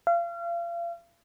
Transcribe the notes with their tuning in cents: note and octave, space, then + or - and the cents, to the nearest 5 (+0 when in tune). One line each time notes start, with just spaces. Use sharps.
F5 -35